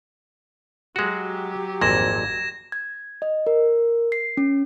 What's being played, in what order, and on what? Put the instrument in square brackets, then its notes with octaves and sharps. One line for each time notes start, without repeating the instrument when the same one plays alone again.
[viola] F#3 G4 [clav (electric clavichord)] G#3 F#4
[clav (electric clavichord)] G#1 F2 A#2 [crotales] G#6 A#6 E7
[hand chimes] G#6
D#5
A#4
C7
C#4